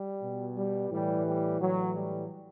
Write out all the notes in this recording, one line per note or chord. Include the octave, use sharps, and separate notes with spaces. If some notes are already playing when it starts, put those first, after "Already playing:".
Already playing: G3
B2
G3
A2 E3 G3
G3
A2 E3 F#3
G3